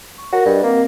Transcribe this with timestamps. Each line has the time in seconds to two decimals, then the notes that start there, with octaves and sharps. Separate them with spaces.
0.18 C#6
0.33 F#4 A#4
0.46 G2 B4 D#5
0.63 A#3 C4